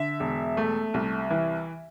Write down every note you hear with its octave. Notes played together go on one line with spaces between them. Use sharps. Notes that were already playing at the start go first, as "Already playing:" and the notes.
Already playing: D3 E5
E1
A3
C2
E3